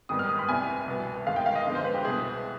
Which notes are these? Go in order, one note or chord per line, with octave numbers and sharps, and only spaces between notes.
G#2 D#3 G3 B3 D#6
F6
D#6
B5
C2 C3 G3 B3 G#5
C2 B2 B3
G#2 D#3 G#3 F5
G5
F5
D#5
F2 D3 G#3 B3
C5
B4
G4
C2 B2 B3 G#4